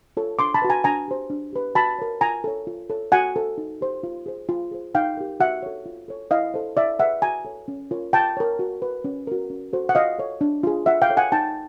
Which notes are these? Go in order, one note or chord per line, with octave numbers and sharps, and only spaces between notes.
F4 A4 C#5
D4 C6 D6
A5 B5
F#4 B4
G#5 A#5
D4 G#5 A#5
G4 C5
D4
G4 B4
F#4 A5 B5
A#4 C#5
F4 G#5 A#5
A4 C#5
F4
A4 C#5
F#4 F#5 G#5
A4 C5
D#4
G4 C5
F4
G#4 C5
F4
G#4 C5
D#4 F5 G5
G4 A#4
F#4 E5 F#5
A4 C#5
F4
A4 C#5
E4 D#5 F5
A4 C5
E4 D5 E5
G#4 B4 E5 F#5
F#4 G#5 A#5
A4 C#5
C#4
F4 A#4 C#5
F4 G5 A5
A#4 C#5
F#4
B4
C#4
F#4 A#4
C#4
F#4 A4 C5
F#5
F4 D#5 F5
A4 C#5
D4
F4 G#4
F4 E5 F#5
F5 G5
A4 C#5
F#5 G#5
D#4 G5 A5